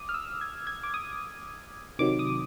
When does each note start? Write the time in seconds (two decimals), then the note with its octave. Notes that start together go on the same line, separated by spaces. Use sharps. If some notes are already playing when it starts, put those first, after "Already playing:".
Already playing: D6 D#6
0.09 F6
0.14 E6
0.41 G#6
0.67 G#6
0.83 D6
0.94 D#6
1.99 C3 D#3 F#3 D6
2.19 D#6